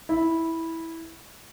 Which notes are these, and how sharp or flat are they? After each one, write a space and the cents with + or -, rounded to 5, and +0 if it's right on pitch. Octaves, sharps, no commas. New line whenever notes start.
E4 -10